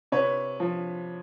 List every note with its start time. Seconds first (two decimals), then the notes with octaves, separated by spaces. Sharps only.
0.12 C3 B4 C#5
0.60 F3